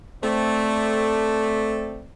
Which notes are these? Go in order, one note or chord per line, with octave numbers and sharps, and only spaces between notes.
A3 C4 D5